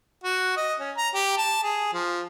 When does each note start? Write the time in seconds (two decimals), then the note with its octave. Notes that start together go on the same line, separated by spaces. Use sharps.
0.24 F#4
0.57 D#5
0.80 C#4
0.97 A#5
1.15 G4
1.38 A5
1.63 G#4
1.93 F3